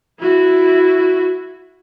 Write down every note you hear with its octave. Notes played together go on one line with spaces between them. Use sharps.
E4 F#4